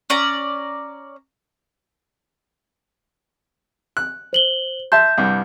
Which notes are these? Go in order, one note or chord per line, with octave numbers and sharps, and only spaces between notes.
C#4 D5 A#5
F#6
C5 F#7 G7
E5 A5 C6 G6
C2 G2